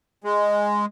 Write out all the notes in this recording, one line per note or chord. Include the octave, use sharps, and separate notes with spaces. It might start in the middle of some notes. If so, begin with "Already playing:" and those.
G#3